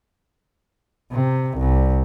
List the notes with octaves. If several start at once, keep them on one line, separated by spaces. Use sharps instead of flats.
C3
C2